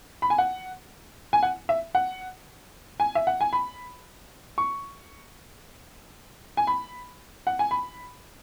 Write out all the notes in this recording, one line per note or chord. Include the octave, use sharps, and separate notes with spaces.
B5
G#5
F#5
G#5
F#5
E5
F#5
G#5
E5
F#5
G#5
B5
C#6
G#5
B5
F#5
G#5
B5